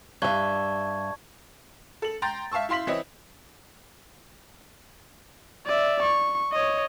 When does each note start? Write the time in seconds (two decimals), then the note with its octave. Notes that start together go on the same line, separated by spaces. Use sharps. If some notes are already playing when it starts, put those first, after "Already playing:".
0.22 G2 D5 E5 A5 C#6 G#6
2.02 A4 F#7
2.22 G5 A#5 C6 G6 A6
2.52 E5 F5 A5 C#6 E6
2.69 E4 F5 C6 B6 F#7
2.87 E3 C4 E4 C#5 D#5
5.66 D5 E5
6.03 C#6
6.52 C#5 D#5